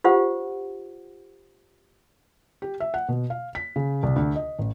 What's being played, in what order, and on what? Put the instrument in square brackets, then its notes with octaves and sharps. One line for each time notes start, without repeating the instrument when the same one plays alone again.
[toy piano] F4 G4 C5 F#5
[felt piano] G4
E5
F#5
B2
F5
B6
C#3
C2
D2
D#5
A1